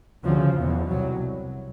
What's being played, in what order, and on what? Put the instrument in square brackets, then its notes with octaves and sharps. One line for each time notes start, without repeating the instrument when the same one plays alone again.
[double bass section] D2 C#3 F3
E2 B2
C2 F#3